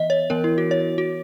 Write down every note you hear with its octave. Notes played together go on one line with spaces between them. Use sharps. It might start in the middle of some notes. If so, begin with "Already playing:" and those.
Already playing: E3 B3 D#5 E5
C#5
E3 B3 A#4
E4
F#4
C#5
F#4